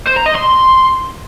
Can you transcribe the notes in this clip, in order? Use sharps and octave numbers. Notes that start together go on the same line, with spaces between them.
C5
A#5
D#5
C6